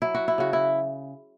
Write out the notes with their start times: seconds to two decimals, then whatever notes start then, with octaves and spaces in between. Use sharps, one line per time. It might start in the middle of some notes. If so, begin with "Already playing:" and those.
0.02 F#3 E4
0.14 F#4
0.28 E4
0.38 C#3 F#4
0.53 E4